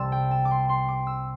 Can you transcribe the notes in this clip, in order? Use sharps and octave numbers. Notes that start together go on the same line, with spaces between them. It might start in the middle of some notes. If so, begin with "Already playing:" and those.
Already playing: C2 C3 G3 A5 C6 E6
G5
A5
D6
C6
C6
D6
E6